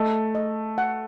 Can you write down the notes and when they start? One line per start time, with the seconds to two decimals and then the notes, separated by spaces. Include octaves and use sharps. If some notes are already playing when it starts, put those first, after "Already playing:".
Already playing: A3 D#5
0.35 D#5
0.78 F#5